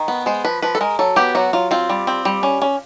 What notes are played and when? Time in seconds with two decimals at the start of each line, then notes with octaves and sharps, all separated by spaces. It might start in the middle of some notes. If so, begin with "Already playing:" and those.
Already playing: D#3
0.08 B3
0.26 G#3 C5
0.45 F3 B4
0.62 F3 B4
0.75 A4
0.81 G#3 A#4
0.99 F#3 A4
1.16 B3 G4
1.35 F#3 F#4
1.53 F#3 F4
1.71 C4 F4
1.89 G3
2.07 C4
2.25 G3
2.43 C#4
2.62 C#4